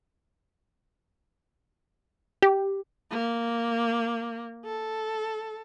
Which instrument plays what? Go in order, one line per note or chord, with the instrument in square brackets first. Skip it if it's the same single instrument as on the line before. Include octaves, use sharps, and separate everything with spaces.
[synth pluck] G4
[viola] A#3
A4